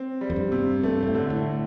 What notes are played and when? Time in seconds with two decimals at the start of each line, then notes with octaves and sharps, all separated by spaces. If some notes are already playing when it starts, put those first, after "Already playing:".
Already playing: C4
0.21 G3
0.30 F2
0.36 G2
0.52 C3
0.83 G2 A3
1.02 A#2
1.07 A2
1.14 D3
1.30 A2